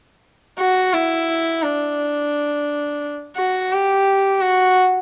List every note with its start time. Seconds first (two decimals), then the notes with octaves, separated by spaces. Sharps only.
0.59 F#4
0.93 E4
1.63 D4
3.37 F#4
3.72 G4
4.42 F#4